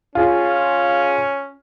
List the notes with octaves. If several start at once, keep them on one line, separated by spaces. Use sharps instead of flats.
C#4 F4 G#4